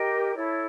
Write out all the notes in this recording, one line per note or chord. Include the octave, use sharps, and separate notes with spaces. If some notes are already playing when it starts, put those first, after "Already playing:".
Already playing: G4 A#4 D#5 G5
E4 A4 C#5